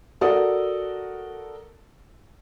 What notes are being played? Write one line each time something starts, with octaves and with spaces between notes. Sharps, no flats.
F#4 A4 A#4 D5 F#5 D#6